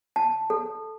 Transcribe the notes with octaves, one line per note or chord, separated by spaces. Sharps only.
A5
A4